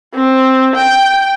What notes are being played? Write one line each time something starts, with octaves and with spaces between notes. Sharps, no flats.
C4
G5